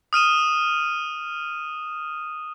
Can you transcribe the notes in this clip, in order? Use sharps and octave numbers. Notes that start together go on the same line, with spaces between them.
D#6 F6 D#7 E7